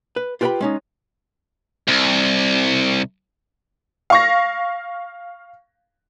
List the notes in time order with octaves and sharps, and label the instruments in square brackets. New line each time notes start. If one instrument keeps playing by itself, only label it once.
[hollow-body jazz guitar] B4
F4 G4 B4 D#5 G5 B5
G#3 C#4 D#4
[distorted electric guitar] C2
[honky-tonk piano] F5 C#6 A#6